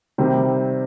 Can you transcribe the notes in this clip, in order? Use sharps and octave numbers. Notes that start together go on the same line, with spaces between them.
C3 D#3 G3 C4